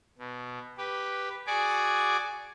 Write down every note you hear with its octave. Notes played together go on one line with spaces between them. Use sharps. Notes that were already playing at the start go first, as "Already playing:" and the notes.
B2
G4 B4
F#4 G#4 D5 G#5 D6